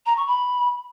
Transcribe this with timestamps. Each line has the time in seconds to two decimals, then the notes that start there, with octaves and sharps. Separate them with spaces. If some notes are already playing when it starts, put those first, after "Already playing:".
0.06 A#5
0.16 C#6
0.27 B5